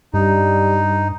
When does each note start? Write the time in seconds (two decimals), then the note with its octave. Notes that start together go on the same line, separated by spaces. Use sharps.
0.14 G2 G3 D#4